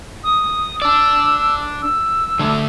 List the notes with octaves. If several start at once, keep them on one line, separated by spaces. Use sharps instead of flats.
D#6
D4 D5 E6
E6
D3 A3 D4